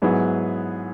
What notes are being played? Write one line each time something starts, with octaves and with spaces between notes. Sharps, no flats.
G#2 F#3 B3 E4 G#4